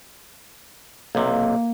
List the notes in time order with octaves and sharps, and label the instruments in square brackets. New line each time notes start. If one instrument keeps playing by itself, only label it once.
[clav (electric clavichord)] B1 C3 [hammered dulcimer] A#3